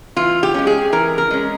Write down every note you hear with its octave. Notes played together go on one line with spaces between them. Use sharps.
E3 F4
G4
G#3 C#4
G#4
E3 A#4
A#4
G#3 C#4